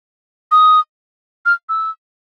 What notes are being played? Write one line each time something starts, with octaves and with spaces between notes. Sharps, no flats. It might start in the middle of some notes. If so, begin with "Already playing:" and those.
D#6
F6
E6